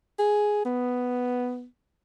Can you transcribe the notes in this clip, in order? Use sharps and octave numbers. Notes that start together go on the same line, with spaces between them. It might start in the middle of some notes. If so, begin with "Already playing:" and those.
G#4
B3